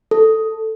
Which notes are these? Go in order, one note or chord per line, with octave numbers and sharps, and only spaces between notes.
A4